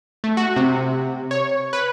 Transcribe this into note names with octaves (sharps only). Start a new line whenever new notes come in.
A3
F#4
C3
C#5
B4